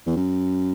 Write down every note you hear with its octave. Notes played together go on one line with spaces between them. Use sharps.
E2
F#2